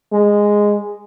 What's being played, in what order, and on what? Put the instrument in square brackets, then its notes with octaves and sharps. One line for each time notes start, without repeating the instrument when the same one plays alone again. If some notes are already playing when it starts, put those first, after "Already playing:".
[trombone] G#3